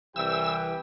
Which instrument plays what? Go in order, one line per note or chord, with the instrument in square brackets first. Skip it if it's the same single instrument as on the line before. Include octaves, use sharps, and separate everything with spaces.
[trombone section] C2 E3 [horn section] G4 B4 G5 [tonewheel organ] E6